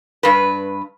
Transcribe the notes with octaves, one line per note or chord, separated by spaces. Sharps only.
G2 B4